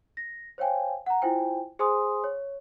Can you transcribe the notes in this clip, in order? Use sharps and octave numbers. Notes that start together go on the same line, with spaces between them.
A#6
C5 C#5 F5 G5 G#5
F#5 A#5
E4 F4 C5 G5 G#5
G#4 C5 G#5 C6 D#6
C#5